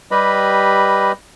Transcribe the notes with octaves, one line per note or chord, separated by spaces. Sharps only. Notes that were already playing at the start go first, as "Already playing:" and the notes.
G3 G4 B4 D#5 B5